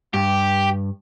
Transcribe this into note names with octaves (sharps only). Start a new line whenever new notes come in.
G2 G4